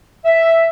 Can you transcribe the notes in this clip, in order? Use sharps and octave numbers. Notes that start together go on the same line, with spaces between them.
E5